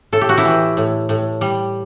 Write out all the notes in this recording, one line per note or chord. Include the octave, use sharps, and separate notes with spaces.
A2 A4
G4
F#4
E4 G4
E3
A2
A2
G3